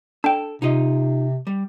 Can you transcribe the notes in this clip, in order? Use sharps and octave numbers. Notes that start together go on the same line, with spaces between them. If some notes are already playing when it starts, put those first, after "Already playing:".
D4 A4 G5
C3 D#4 F4 D#5
G3